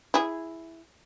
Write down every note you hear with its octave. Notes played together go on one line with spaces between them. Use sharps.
E4 G#4